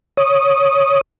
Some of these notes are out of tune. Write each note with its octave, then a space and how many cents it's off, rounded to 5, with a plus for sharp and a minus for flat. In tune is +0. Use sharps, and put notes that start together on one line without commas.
C#5 +0 D#6 +0